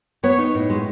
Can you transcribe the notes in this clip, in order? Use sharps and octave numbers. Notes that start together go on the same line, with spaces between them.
B3 C#5
D#4
A2
G#3